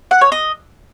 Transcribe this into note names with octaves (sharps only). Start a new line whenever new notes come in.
F#5
C#5
D#5